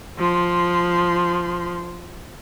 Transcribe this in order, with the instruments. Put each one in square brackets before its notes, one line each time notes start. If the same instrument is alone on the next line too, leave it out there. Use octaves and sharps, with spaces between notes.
[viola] F3 C6